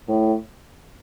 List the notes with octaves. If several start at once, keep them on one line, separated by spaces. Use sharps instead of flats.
A2